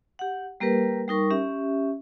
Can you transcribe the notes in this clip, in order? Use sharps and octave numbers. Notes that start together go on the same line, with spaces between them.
G4 F#5
G3 A#3 G4 A#4 B4
G3 D#4 A#4 C#6
C#4 G4 E5